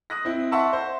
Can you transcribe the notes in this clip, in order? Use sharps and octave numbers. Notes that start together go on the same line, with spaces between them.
D#6 F#6 A#6
C4 E4
E5 F#5 A5 C6 C#6 E6
C5